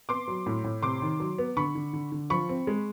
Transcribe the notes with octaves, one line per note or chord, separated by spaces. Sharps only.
B3 C6 D6
F#3
A2
A2
C3 C6 D6
D#3
F#3
B3
D3 B5 C#6
D3
D3
D3
F3 B5 C#6
C4
G#3